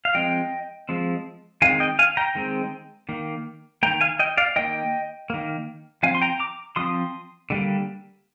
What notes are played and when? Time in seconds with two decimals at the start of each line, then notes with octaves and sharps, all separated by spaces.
0.05 F5
0.14 F3 G#3 C4 D#5 G5
0.89 F3 G#3 C4
1.62 D#3 G#3 C4 F5 G#5
1.80 D#5 G5
1.99 F5 G#5
2.17 G5 A#5
2.35 D#3 G#3 C4
3.09 D#3 A#3
3.83 A#3 G5 A#5
3.87 D#3
4.01 F5 G#5
4.19 D#5 G5
4.37 D5 F5
4.56 D#3 A#3 D#5 G5
5.30 D#3 A#3
6.03 F3 C4 F5 G#5
6.15 C6
6.22 G5 A#5
6.39 A#5 D6
6.76 F3 C4 C6 D#6
7.50 D3 G3 A#3